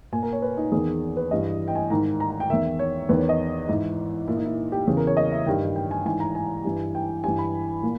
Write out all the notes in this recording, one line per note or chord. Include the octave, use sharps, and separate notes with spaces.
A#2 G#5
A#4
C#5
B4
D#4
E2 D#3 G#4
B4
G2 E3 D#5
G5
G#5
G#2 D#3 A#5
A#5
A#5
G5
E2 D#3 E5
C#5
E2 D#3 B4
C#5
D#5
G#2 E3 E4
A#2 E4
D#4
E4
G4
E2 C#3 E3 G#4
A#4
C#5
D#5
E5
G2 D#3 G5
G5
G#5
G#2 E3 G#5
A#5
G#5
G2 E3
G5
G2 E3 G#5
B5
A#2